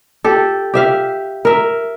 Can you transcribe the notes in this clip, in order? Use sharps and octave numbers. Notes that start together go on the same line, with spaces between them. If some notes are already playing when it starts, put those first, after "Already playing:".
G4 A4
G4 E5 F5
A#4 E5